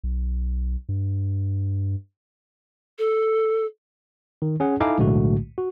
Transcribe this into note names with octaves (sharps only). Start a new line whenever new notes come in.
B1
G2
A4
D#3
C#4 G#4 F#5
D#4 E4 A4 F5 G#5 D6
B1 A2 D3 G#3 A3 F#4
F#4